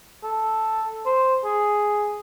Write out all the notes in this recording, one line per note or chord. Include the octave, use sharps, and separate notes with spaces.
A4
C5
G#4